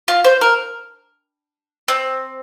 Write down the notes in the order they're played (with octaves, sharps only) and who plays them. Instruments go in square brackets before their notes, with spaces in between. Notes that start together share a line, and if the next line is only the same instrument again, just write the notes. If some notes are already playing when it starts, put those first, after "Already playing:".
[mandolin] F4
C5
A#4
C4